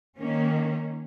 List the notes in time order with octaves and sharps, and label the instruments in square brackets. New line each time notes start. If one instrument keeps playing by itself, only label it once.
[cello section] D#3 A#3 C#4